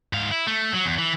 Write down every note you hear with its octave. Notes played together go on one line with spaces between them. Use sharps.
G#2 F5
E4
A3
F#3
E2
E3